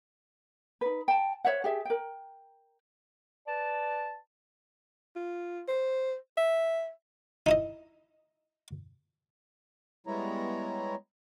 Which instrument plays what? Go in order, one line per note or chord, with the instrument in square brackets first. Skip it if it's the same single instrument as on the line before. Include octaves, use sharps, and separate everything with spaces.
[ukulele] D#4 B4
G5 A5
C5 C#5 E5 F#5
G4 G#4 E5
A#4 G5
[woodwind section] B4 D5 A5
[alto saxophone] F4
C5
E5
[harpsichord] D#4 E4 D#5
[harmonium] G3 G#3 B3 E4 C#5 A#5